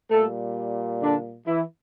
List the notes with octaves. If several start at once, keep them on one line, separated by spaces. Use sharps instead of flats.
A#2 G3 A3 A4
D3 D4
E3 E4